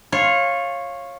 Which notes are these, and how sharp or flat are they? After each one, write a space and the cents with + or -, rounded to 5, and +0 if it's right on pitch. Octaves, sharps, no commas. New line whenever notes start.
F4 +0 C#5 -15